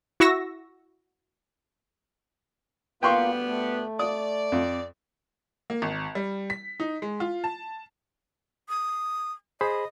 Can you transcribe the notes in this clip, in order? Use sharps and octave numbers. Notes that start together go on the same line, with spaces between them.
E4 F#4 C#6 E6 A#6
D2 G3 A#3 B3 F4 G5 C6 C#6
A3
D5 D#6
F2
A#3
G#1
G3
B6
D#4
G#3
F4
A5
D#6
G#4 C5 D#5 B5